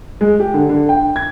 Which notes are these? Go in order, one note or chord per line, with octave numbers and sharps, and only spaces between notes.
G#3
G4
D3
D3
G5
G#6